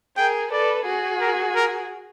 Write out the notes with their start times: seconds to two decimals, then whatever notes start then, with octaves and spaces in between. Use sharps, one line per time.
0.17 G#4 A#4 G5
0.52 A4 B4 D5
0.86 F#4 G#4
1.21 A#4
1.55 A#4